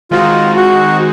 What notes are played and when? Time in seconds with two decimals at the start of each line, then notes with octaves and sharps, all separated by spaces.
0.11 D#3 G#3 C4 D#4 F4 F#4
0.56 F#4